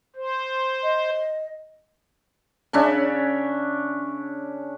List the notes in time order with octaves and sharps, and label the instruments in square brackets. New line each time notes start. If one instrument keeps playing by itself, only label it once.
[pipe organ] C5
[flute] D#5
[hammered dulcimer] C#3 C#4 D4 E5